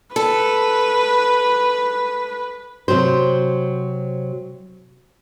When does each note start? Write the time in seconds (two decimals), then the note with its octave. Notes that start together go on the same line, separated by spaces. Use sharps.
0.16 A4 B4
2.88 C3 F#3 F#4 C5